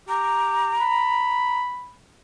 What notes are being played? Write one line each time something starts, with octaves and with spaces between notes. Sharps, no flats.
G4 A#5
B5